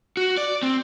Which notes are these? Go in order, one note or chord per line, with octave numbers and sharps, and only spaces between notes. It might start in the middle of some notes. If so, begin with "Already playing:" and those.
F#4
D5
C4